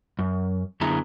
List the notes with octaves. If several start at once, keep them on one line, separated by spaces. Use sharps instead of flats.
F#2
F#2 D3 B3 E4 G#4 A#5